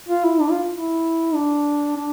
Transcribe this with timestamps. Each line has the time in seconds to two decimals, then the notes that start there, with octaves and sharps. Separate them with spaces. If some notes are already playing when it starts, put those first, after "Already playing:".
0.08 F4
0.24 E4
0.40 D4
0.50 F4
0.72 E4
1.34 D4
1.97 D4